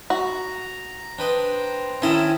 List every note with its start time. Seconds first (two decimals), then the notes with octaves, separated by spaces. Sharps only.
0.10 F#4 A#5
1.19 D4 B4 C5 D#5 G5 A#5
2.02 D#3 C#4 E4 D#5 A5